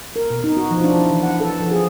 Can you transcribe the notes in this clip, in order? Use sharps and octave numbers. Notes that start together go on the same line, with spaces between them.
A#4
B2
D#4
F#4
F3
D4
E4
E3
F#5
A4
F3
G#4